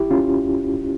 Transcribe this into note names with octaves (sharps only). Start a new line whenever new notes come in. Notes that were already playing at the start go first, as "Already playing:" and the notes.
Already playing: E4 G4
C#4 F4